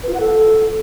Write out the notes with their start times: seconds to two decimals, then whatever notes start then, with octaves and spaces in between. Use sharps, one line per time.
0.03 B4
0.09 F4
0.15 F#5
0.20 A4